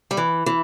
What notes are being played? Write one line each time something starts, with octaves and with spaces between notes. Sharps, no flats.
G3
E3
E3